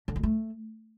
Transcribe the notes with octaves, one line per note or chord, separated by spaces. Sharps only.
D3
G2
A3